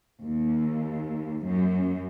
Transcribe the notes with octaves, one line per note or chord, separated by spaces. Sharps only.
D#2
F#2